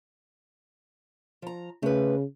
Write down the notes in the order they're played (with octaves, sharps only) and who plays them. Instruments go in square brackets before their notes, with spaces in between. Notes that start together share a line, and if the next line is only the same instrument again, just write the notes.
[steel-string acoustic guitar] F3 A#5
[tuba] C#3 [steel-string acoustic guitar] A3 B4